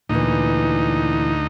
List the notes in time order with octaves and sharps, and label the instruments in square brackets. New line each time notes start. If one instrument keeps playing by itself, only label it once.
[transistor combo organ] D2 D#4 [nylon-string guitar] A#2 E3